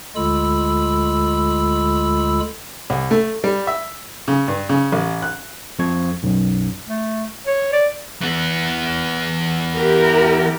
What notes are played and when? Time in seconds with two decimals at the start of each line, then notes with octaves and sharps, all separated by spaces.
0.16 D2 D3 G#3 F4 B5 E6
2.90 C2
3.11 A3
3.44 G3
3.67 E5
4.28 C#3
4.48 G2
4.69 C#3
4.92 A1
5.22 F#6
5.79 F2 F3 C4 C#6 G#6
6.23 B1 F#2 F#3
6.88 A3
7.47 C#5
7.73 D5
8.22 E3 B3
9.77 E4 G4 A#4